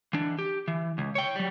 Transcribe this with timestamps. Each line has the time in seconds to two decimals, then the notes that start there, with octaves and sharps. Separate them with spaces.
0.13 E3 D4
0.39 G4
0.68 E3
0.98 C#2
1.15 C#5 G5
1.35 F#3 G3